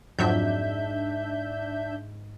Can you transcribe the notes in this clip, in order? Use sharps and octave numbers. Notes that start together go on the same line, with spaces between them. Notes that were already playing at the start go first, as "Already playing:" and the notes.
F2 G#2 F#3 D4 E5 G6